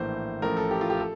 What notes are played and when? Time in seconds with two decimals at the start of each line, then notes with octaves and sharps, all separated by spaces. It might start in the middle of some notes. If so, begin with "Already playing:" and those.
Already playing: A#1 A2 E3 A#3 C5
0.42 A1 A2 F3 A3 A#4
0.57 A4
0.71 G4
0.81 F4
0.90 G4
1.00 A4